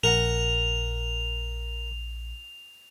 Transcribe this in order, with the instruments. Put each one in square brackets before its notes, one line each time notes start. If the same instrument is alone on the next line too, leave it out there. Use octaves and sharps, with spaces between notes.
[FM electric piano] A#1 [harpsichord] A#4 F#5 A#5 [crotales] F7